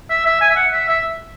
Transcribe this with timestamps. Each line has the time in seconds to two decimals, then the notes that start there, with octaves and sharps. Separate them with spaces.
0.10 E5
0.26 E5
0.41 G#5
0.50 E5
0.56 F#5
0.73 E5
0.89 E5